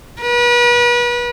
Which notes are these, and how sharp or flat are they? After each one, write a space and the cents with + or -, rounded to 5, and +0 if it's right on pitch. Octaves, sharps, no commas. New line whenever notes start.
B4 -35